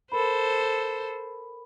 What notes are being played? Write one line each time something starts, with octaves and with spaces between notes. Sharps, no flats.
A4 A#4 C5 B5